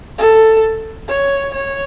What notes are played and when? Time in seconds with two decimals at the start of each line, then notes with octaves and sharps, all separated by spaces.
0.18 A4
1.08 C#5
1.53 C#5